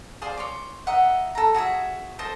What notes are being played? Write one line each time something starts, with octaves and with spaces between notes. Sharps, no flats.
G#4 C5 D5 F5
C#5 C6 D6
A#4 D#5 E5 F#5
A4 A#5
F#4 G#4 C#5 E5
A4 C5 D#5 A5